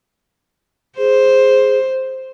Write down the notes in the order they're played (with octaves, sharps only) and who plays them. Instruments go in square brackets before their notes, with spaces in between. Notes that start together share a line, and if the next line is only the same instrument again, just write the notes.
[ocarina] G#4 [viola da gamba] C5